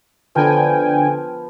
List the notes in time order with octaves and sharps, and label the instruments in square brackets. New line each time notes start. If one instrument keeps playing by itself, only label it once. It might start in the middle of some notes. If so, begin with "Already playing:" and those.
[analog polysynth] D3 G5 G#5 [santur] F3 B3 A#4